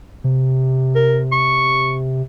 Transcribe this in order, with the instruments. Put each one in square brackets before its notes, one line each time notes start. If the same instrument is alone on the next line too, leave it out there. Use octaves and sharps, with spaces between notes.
[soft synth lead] C3
[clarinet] A#4
C#6